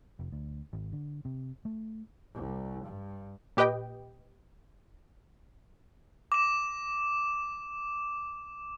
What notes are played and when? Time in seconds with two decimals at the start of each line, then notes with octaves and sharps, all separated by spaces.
0.19 F1
0.32 D2
0.73 G#1
0.93 D3
1.25 C3
1.65 A3
2.34 C2
2.86 G2
3.57 A#2 G4 B4 D#5 G5
6.32 D6 E7